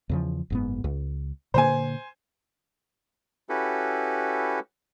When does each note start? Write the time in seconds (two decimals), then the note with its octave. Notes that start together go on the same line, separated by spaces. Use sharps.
0.09 E2 C#3 F3
0.50 F#1 G#2 B3
0.84 C#2
1.54 A#2 D3 A#3 C5 G#5
3.49 C#4 E4 F#4 G4 A4 B4